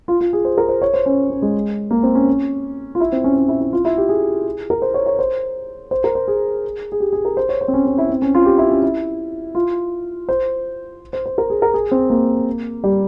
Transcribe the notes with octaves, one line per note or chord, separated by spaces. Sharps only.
F4
F4
G#4
C5
A#4
C5
C#5
C5
C#4
C#4
G#3
A#3
C4
C#4
F4
E4
C4
C#4
C#4
E4
E4
F4
E4
G4
G#4
A#4
C5
C#5
C#5
C5
C5
A#4
C5
G#4
G#4
G4
G#4
A#4
C5
C#5
C5
C4
C#4
C#4
E4
C4
C#4
F4
G4
E4
C#4
E4
F4
C5
C5
C5
A#4
G#4
A#4
G#4
C4
A#3
G3